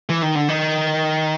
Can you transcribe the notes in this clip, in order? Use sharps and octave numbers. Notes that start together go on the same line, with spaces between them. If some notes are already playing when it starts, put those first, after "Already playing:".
E3
D#3
D3
D#3